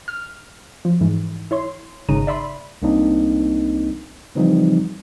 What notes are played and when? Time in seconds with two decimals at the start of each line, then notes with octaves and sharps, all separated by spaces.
0.08 F6
0.85 F3
1.01 G#2 E3
1.51 E4 C#5 C6
2.09 G#1 C#3 D#4 A#5 D#7
2.27 D5 E5 B5 C6
2.82 C2 A#3 C4 D4 D#4
4.35 C#3 E3 F3 G3 C4 D#4